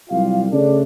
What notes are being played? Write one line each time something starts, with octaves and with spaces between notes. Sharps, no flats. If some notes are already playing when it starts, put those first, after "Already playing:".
C2 F#3 F4 G4 F5
C#3 A3 D4